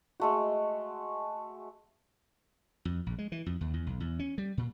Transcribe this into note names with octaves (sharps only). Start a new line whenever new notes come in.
G#3 A3 F#4
F2
A#1
G#3
E3
F2
D#2
E2
B1
E2
C#4
G3
A#2